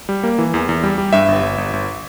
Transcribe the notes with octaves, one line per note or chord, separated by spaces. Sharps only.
G3
A#3
E3
E2
E2
G3
G3
G2 E5
G1
G1
G1
G1